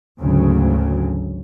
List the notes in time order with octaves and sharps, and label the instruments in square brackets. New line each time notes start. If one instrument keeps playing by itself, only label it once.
[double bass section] G#1 D2 C#3 F#3